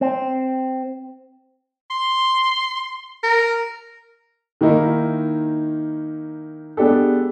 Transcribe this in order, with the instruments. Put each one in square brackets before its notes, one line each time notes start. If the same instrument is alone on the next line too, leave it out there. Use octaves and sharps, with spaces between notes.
[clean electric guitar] C4
[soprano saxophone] C6
A#4
[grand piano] D#3 A#3 D#4 E4 A#4
G#3 B3 D4 G4 A4